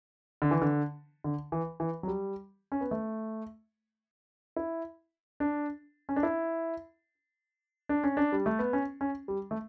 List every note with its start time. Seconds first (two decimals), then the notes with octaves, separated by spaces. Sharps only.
0.42 D3
0.51 E3
0.62 D3
1.24 D3
1.52 E3
1.80 E3
2.03 F#3
2.07 G3
2.72 C#4
2.81 B3
2.91 A3
4.56 E4
5.40 D4
6.09 C#4
6.16 D4
6.23 E4
7.89 D4
8.04 C#4
8.17 D4
8.32 G3
8.46 A3
8.59 B3
8.73 C#4
9.01 C#4
9.28 G3
9.51 A3